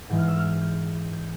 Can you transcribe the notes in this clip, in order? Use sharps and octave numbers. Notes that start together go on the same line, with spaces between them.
G#2 E3 G#3 G6
F6
E6
F6
G6
G6